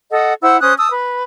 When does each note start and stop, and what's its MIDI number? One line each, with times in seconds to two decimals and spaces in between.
0.10 0.34 69
0.10 0.34 75
0.10 0.34 78
0.43 0.60 64
0.43 0.60 72
0.43 0.60 78
0.43 0.60 88
0.61 0.73 61
0.61 0.73 72
0.61 0.73 87
0.61 0.73 90
0.78 0.90 81
0.78 0.90 87
0.78 0.90 88
0.90 1.22 71